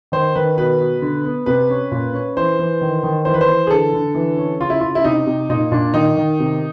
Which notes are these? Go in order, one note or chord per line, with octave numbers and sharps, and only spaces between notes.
D#3 C5
D#3 B4
B2 B4
B2
D3
B3
C3 B4
C#4
A#2
C#4
E3 C5
E3
D#3
D#3
E3 C5
B4
C5
E3
G#4
D3 A4
D3
E3
C#4
C#3 F4
E4
C#3 F4
E4
C3 D#4
C3
A#2 D#4
A#2 D4
D#3 D#4
D#3
C3